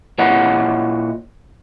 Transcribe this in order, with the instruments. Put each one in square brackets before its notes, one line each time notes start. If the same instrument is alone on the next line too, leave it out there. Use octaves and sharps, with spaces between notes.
[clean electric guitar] A#2 E4 C#5 D#5 F#5